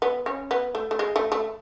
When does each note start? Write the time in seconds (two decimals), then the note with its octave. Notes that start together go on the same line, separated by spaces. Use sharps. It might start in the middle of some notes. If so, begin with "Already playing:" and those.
0.02 B3
0.26 C#4
0.51 B3
0.75 A3
0.91 A3
0.99 G#3
1.16 A3
1.32 A3